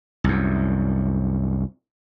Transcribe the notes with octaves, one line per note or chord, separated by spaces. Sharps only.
C2 F#2